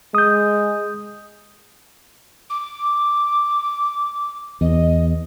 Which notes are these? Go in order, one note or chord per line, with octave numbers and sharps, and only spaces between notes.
G#3 D#6 G6
D6
E2 D#5